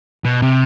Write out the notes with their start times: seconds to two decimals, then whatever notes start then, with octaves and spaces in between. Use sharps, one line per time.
0.24 B2
0.42 C3